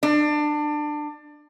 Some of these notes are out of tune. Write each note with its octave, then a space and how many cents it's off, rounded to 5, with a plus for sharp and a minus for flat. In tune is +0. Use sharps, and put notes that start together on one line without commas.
D4 +25